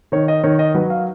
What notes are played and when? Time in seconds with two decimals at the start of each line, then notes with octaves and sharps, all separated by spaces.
0.12 D#3 C#5
0.28 D#5
0.43 D#3 C#5
0.59 D#5
0.74 F#3 B4
0.90 F5